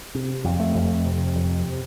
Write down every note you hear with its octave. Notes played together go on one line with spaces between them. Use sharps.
C3
F2
A3
F2
C3
F2